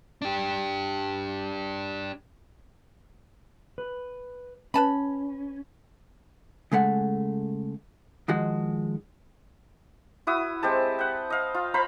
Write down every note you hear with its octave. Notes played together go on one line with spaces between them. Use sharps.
D4 G4
B4
C#4 B4 A5 B5
C#3 G#3 A3 F#5
D#3 F3 G#3 F#4
E4 F#4 D#6
G#3 C4 G4 A5
F#5 G5
D#5 F5
F4
C5 F5 A#5 B5